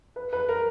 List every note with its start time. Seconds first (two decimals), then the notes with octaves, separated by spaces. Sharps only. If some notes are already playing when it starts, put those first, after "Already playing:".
0.16 B4
0.33 B4
0.49 A#4